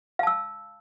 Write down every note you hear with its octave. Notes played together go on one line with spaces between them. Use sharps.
F5 A5 E6